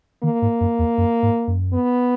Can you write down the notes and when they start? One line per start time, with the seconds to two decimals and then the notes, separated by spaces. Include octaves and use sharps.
0.23 D#3 A#3
0.42 G#2
0.61 F#2
0.79 E2
0.98 F#2
1.23 G#2
1.47 F#2
1.73 B3